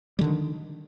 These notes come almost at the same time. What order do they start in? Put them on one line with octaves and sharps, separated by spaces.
G3 D3 D#3